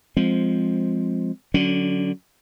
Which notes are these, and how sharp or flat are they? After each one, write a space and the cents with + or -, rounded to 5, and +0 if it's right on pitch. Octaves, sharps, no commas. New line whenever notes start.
F3 +5 G#3 +0 C4 +0
D3 +0 F#3 +0 C#4 +20